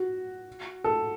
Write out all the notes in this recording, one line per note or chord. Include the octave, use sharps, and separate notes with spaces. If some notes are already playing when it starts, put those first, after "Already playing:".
Already playing: F#4
A4